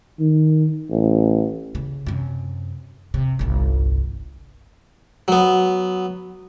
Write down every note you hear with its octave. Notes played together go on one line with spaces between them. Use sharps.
D#3
A1
C#3
F#2 C3
C3
G1 C2
F#3 B3